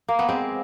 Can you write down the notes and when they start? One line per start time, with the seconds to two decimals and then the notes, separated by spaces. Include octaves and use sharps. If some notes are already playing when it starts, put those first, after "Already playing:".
0.08 A#3
0.19 B3
0.29 G#3 C4